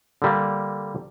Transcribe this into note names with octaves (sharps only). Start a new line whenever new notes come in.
D3 G3 A#3